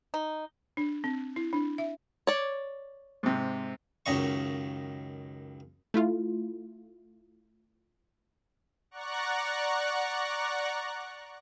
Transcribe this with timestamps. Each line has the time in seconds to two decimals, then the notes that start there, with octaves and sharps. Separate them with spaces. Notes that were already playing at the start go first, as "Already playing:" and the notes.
0.14 D#4
0.77 D4
1.04 C4
1.36 E4
1.53 D4
1.78 E5
2.27 C#5 D5
3.23 G#2 C3
4.06 C#2 F#2 D#3 D#5 C#6
5.94 A3 E4 F4
8.91 D5 F#5 A#5 C#6 F#6